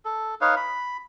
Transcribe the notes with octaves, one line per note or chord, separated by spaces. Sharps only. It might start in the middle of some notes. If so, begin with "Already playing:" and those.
A4
D#4 B4 C#5 F5
B5